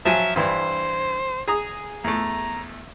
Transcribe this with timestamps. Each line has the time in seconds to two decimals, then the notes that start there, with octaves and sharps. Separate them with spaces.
0.05 F3 F#3 E5 G#5
0.36 G2 E3 D4 C5
1.48 G#4 A#5 D#6
2.04 E2 A3 A#5